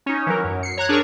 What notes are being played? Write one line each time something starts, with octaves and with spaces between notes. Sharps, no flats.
C#4 D#4
E3 F#3 A#4
F#2
C7 C#7
C#5 A#5 F#6 G#6
D4 G#4 A#4 C#5 C#6